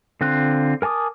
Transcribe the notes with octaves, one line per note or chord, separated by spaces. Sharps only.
D3 C4 F4 F#6
A#4 G#5 A5 D6 D#6